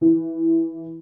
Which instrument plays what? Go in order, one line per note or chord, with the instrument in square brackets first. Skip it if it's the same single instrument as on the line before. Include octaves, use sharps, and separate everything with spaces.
[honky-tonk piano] E3